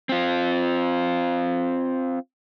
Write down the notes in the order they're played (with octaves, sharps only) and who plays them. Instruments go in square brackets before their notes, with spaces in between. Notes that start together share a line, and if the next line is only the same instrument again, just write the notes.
[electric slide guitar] C4 F4